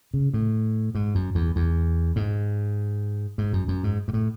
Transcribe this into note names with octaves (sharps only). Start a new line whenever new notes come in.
C#3
A2
G#2
F#2
E2
E2
G#2
G#2
F#2
F#2
G#2
G#2
A2